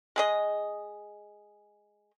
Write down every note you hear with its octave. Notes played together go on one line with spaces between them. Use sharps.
G#3 G#4 D#5